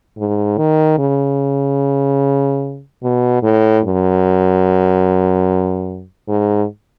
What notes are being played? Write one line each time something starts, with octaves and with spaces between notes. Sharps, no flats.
G#2
D#3
C#3
B2
A2
F#2
G#2